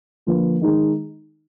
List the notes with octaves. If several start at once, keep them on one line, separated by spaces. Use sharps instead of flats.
D3 F3 A#3 F4 B4
D#3 G#3 D#4 G#4